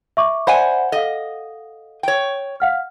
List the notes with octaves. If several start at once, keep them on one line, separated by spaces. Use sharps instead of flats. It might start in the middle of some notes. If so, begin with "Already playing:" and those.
E5 C#6 D6
C5 D5 E5 F#5 G#5 B5
A4 D#5 F5
C#5 G5
F5 F#5 F6